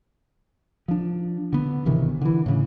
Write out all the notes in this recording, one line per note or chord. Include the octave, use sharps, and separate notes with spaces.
F3 D4
D3 B3
G#1 C3 D#3 E3
D3 E3
A2 C#3